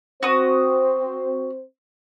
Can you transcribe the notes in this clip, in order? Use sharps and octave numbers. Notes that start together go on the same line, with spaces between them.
C4 F#4 C5 D#6